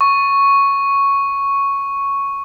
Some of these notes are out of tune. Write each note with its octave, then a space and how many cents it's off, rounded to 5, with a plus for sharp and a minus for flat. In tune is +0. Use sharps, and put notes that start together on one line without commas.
C#6 +0